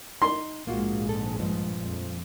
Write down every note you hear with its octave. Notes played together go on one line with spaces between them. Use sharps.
D#4 C6
A#1 G#2 G#3 A#3 F4 F#4
A4
G2 A#2 F3
F2